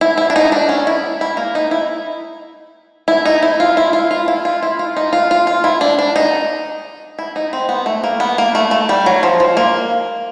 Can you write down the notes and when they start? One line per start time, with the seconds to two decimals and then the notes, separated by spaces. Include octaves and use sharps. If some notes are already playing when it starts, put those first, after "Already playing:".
0.01 E4
0.18 E4
0.30 D4
0.36 D#4
0.52 D4
0.69 C#4
0.87 E4
1.21 E4
1.37 A#3
1.55 D#4
1.71 E4
3.08 E4
3.25 D#4
3.43 E4
3.60 F4
3.77 E4
3.93 F4
4.11 F4
4.28 E4
4.45 F4
4.63 E4
4.79 F4
4.97 D#4
5.13 F4
5.31 F4
5.47 F4
5.64 E4
5.81 D4
5.99 D4
6.16 D#4
7.19 E4
7.36 D#4
7.53 C4
7.69 B3
7.86 A3
8.04 A#3
8.20 B3
8.38 A#3
8.55 A3
8.71 A3
8.89 G3
9.06 F#3
9.23 F3
9.40 F3
9.57 A#3